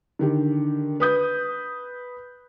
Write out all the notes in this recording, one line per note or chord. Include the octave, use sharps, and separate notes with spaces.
D3 D#3 G4
B4 D#6 G6